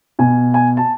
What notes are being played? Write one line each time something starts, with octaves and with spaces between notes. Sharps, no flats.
B2 G#5
G#5
A5